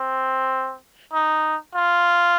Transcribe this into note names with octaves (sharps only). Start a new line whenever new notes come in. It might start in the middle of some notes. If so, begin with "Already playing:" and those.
Already playing: C4
D#4
F4